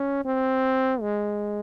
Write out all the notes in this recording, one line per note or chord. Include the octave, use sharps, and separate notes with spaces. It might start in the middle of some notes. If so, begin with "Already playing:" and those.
Already playing: C#4
C4
G#3